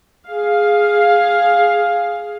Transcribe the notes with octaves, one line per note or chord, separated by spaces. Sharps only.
G#4 F5